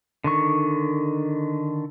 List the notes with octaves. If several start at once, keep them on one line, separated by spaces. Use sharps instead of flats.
D3 D#3 C#6